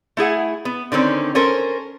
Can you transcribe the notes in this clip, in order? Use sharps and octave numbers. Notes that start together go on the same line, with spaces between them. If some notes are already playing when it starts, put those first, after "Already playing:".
A3 E4 G#4 F#5
B3
D3 D#3 C4 C#4
C#4 A4 A#4 C5